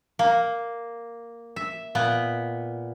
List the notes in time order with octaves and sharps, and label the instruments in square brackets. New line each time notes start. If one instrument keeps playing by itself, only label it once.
[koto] A#3
E5
A#2 B3